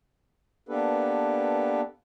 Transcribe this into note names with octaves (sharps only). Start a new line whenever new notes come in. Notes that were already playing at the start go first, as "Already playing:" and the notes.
A#3 B3 D4 G4 A4 B4